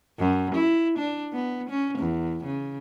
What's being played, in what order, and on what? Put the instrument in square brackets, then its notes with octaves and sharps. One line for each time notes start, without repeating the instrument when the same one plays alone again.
[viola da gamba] F#2
E4
D4
B3
C#4
E2
C#3